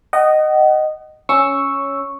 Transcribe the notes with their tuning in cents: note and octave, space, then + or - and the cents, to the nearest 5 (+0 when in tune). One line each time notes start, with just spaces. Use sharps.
D#5 -10 F#5 +35
C#4 +0 C#6 +0 E6 +0